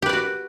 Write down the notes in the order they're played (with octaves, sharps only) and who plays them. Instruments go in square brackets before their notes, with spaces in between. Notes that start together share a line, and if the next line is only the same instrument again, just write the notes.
[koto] G4
B4
D5
F#4